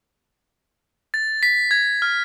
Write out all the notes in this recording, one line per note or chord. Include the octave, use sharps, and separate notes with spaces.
A6
B6
G#6
F6